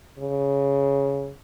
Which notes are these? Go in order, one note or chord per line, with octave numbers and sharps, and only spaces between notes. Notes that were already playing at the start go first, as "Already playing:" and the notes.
C#3